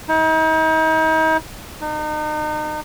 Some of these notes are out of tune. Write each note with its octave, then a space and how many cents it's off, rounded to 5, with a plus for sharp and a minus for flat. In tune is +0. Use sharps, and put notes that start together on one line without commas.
D#4 +40
D#4 -35